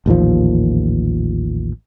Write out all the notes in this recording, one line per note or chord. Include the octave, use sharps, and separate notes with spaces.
A1 D#2 A#2 F3